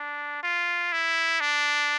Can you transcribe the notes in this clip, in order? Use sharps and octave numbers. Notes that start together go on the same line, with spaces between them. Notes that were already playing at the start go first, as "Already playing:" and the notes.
Already playing: D4
F4
E4
D4